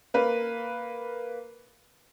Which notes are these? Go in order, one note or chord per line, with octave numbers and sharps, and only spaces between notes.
A#3 B4